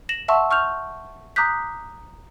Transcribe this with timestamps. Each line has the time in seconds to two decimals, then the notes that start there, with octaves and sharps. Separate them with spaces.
0.09 A#6 E7 F#7
0.28 E5 F#5 A5 C6 C#6 E6
0.51 C#6 F6 G6 F7
1.36 A#5 D6 D#6 F#6 G6 B6